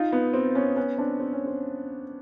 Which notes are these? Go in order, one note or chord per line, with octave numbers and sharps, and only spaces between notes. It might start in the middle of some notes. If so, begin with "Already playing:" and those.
Already playing: D#4 F4
B3
C4
B3 C#4
B3 C#4
C4 D4
C4
C#4
C4